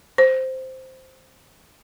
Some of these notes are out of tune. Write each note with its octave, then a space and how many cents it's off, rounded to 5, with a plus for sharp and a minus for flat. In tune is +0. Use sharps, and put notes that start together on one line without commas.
C5 -5